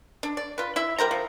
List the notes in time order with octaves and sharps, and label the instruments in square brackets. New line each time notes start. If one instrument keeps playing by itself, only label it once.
[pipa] D4
D5
F4 B4
E4 E5
G3 A#4 C5 A#5
F3